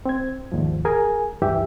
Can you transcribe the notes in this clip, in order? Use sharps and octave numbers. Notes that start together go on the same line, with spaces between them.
C4 G#6
D#2 G#2 F3
G#4 A#4 G#5
C#2 G2 E3 G4 E5